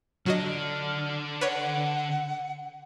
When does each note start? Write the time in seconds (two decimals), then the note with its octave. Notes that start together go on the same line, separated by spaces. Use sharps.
0.26 D3 F#3 D4 F#4 D#5 F6
1.41 B4 C#5 F#5